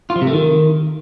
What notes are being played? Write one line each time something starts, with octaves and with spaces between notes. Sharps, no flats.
F4
F3
C3
A3
D#3